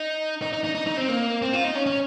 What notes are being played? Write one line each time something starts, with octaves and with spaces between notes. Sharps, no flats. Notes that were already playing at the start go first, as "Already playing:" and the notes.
Already playing: D#4
D#4
D#4
D#4
D#4
D#4
C4
A#3
C4
F4
D#4
C#4
C#4